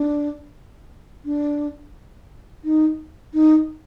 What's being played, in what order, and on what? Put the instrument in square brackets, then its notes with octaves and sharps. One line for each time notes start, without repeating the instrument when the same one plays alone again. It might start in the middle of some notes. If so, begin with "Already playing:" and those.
Already playing: [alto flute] D4
D4
D#4
D#4